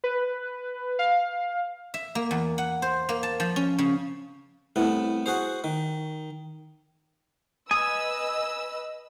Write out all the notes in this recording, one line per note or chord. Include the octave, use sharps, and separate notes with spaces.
B4
F5
E5
A#3
E2
F#5
C5
A#3
A5
F3
C#4
C#3
C2 A2 B3
F#4 G#4 C5
D#3
B4 D#5 G#5 D#6 E6